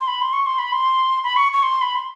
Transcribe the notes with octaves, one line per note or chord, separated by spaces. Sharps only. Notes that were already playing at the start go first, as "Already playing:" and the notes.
C6
B5
C6
C#6
C6
B5
C6
B5
C#6
C#6
C6
B5
C6